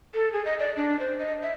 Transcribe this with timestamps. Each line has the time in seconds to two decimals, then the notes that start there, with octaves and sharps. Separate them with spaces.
0.14 A4
0.33 G#4
0.45 D#5
0.60 D5
0.77 D4
0.99 C5
1.19 D#5
1.42 E5